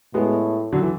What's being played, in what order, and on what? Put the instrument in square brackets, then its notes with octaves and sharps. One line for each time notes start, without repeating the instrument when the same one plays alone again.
[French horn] A2 [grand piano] G#3 B3
[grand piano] D3 F#3
E3